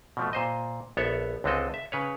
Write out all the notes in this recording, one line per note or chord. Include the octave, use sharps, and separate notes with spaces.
B2 F3 A3
A#2 C5 D#5
A#1 B3 A4 C#5 E5
C#2 D3 G#3 C4 A4 D#5
E5
C#3 B4 C#5